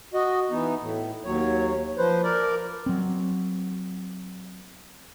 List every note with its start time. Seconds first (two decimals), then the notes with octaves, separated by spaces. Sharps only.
0.14 F#4 D#5
0.51 E3 B3 D#4
0.81 A2
1.24 D#2 F#3 C#5
1.98 F3 B4 C5
2.24 A#4 D5
2.86 F#3 C4